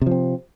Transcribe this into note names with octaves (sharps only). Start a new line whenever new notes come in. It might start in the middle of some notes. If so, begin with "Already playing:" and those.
C3 F3 C4